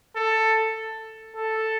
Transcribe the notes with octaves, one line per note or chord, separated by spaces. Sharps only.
A4
A4